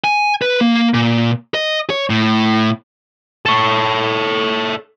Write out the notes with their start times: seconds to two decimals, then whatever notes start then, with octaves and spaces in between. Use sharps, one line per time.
0.04 G#5
0.42 B4
0.61 A#3
0.94 A#2
1.54 D#5
1.90 C#5
2.10 A2
3.46 A4 C#5